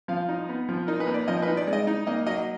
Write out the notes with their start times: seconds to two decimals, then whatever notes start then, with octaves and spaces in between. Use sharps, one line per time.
0.08 F3 F5
0.29 D#4
0.49 B3
0.69 F3
0.87 D#4 A#4
1.00 B4
1.07 A#3
1.14 D5
1.28 F3 D#5
1.42 B4
1.48 D#4
1.57 D5
1.67 G#3 D5
1.73 D#5
1.87 D#4
2.07 A#3 D#5
2.26 F#3 D#5